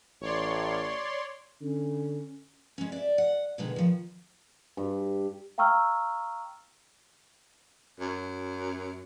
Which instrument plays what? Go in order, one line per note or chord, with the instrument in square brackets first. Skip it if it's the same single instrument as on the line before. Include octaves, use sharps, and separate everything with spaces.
[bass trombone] A1 [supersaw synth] C#5 D5 C6
[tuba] D3 [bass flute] C#4
[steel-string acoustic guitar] G#3 C#4
D5 E5
F#5
B2 D3 D#3 G#3
D#3 F3
[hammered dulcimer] G2
[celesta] F5 G5 A#5 C#6 E6 F6
[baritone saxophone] F#2